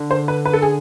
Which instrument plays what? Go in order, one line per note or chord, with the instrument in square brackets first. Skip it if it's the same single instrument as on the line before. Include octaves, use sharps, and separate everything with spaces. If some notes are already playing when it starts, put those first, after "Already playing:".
Already playing: [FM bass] D3
[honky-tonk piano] C5
B4
B4
A4
G#4